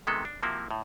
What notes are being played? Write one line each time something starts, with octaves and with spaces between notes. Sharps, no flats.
C3 D#3 G#3 B3 A4
D4
C3 F3 A#3 C4 E4 F#4
A2